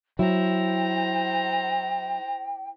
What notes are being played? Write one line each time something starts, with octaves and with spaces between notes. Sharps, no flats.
F#3 E4 C5 G5 A#5